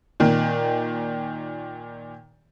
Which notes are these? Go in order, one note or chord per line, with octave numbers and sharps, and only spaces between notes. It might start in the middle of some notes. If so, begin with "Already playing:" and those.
A#2 D#3